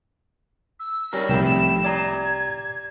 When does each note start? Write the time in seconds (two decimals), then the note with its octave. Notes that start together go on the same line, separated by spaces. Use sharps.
0.79 E6
1.13 G3 C#4 A#4
1.29 C2 F2 A2 E4 G4 G5 E7
1.84 D5 A#5 G#6